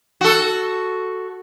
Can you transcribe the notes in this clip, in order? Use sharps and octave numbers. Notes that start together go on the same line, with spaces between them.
F#4 A4